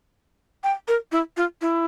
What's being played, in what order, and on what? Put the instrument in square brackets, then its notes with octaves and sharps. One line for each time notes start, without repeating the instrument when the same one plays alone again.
[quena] G5
A#4
E4
F4
E4